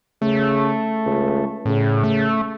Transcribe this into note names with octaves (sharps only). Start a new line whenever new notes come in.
C#3 A3
C#2
A2 C#3
A3